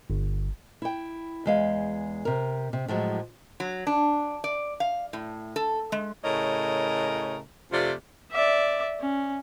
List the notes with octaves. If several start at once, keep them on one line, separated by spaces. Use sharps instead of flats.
G1
E4 G5
E2 G#3 F5
C3 A#4
C3
A2 F3 F#3 G#3
F#3
D4
D5
F5
A2
A4
G#3
A2 C#3 A#4 C#5 D#5
F2 C3 A3 F4 D5
D5 E5
C#4